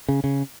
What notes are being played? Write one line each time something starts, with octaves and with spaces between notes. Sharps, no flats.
C#3
C#3